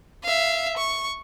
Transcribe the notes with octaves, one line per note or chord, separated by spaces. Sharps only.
E5 F5
C#6